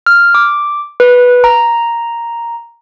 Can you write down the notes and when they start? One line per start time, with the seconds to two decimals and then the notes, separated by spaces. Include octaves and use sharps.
0.07 F6
0.34 D6
1.00 B4
1.44 A#5